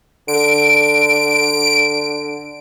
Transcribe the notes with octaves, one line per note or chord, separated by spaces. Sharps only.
D3 D7